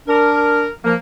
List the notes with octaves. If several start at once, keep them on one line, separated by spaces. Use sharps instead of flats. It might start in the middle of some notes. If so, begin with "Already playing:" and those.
D4 A#4
F3 A#3